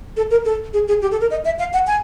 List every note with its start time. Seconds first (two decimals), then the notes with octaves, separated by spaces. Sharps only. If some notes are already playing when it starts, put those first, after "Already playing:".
0.17 A4
0.31 A#4
0.45 A4
0.73 G#4
0.88 G#4
1.02 G4
1.11 A4
1.21 A#4
1.31 D#5
1.45 E5
1.59 F5
1.73 F#5
1.87 G#5